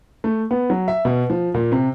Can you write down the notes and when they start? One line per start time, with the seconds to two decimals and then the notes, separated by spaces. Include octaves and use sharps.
0.24 A3
0.51 B3
0.70 F#3
0.88 E5
1.05 B2
1.30 F3
1.54 A#2
1.72 C3